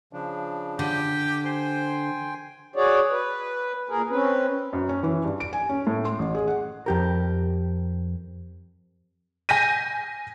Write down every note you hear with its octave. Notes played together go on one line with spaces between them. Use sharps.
C#3 F3 D4
D3 G4
C5 G5 G#5 C6
F#4 G#4 C#5 D5
B4
A#2 G#4 A#4
C4 C#4 B4
F#2
C#4
E3
G2
D7
G#5
C#4
A2
C6
A1
G#4
F#5
F2 G4 A#4
G#5 G6 A#6 B6 D#7